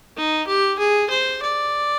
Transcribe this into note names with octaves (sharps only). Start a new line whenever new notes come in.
D#4
G4
G#4
C5
D5